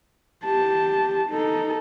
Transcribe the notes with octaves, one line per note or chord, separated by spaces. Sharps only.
G4 A5
D#4 A4